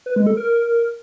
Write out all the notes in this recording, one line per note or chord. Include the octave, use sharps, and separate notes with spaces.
B4
G#3
A4
A#4